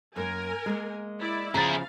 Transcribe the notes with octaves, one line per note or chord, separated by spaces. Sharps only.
F#2 A#3 A#4 G#5
G#3 A#3
E4 D5
C#3 F3 E4 G#4 F5 A#5 A6